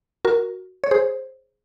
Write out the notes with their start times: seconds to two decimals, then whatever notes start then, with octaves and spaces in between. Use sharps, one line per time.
0.25 F#4 A#4
0.84 C#5
0.91 G#4 C5